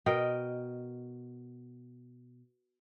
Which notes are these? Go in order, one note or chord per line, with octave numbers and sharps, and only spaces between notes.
B2 A#4 D#5 G5